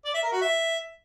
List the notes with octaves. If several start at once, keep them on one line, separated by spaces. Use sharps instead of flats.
D5
E5
A#4
F#4
E5